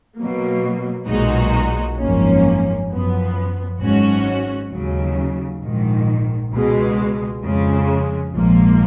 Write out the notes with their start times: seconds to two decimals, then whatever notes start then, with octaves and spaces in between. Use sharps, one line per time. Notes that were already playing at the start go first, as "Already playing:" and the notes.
0.17 B2 F#3 A#3
1.07 B1 A#2 G#3 D#4 F#4
1.98 G#1 F#2 F3 A#3 C#4
2.88 F#2 F3 B3
3.80 G#1 G#2 F#3 C#4 F#4
4.70 D#2 C#3 F#3
5.60 A#1 G#2 D#3
6.51 C#2 B2 G#3
7.42 F2 C#3 G#3
8.32 A#1 G#2 F3 A#3